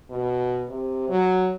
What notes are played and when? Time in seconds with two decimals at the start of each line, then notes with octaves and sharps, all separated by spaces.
0.11 B2
0.70 C3
1.09 F#3